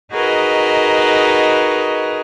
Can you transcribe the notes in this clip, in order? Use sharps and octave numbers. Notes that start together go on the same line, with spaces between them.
D#4 F#4 G#4 A#4 B4 D#5